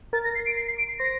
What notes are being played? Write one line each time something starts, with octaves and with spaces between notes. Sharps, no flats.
A#4 A6
A#6
C7
D7
C7
C7
D7
C7
C5 A#6